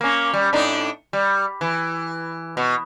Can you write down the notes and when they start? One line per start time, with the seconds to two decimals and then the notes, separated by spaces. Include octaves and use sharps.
0.01 A#3 C#4
0.34 G3
0.53 A2 D4 D#4
1.13 G3
1.61 E3
2.57 B2